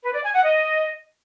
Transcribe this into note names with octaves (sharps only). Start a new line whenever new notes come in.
B4
D5
G#5
F#5
D#5